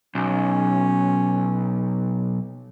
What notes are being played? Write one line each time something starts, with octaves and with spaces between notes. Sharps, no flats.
B1 C#4